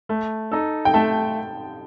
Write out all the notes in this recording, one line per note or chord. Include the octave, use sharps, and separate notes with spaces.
A3
D#4 A4
G5
A3 A5